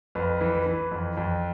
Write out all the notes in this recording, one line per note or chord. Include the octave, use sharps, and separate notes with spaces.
F2 B4
E3
B4
E3
F2
F2